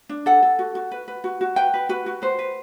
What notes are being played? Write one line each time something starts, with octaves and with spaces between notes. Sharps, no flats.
D4
A4 F#5
A4
F#4
F#4
B4
B4
F#4
F#4
B4 G5
B4
F#4 B4
F#4
B4 C5
B4